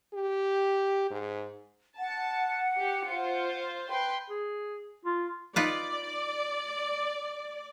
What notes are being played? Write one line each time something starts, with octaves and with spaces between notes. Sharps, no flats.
G4
G#2
F#5 A5
G4
F4 C5
B4 G5 C6
G#4
F4
D#4 F4 B4 D5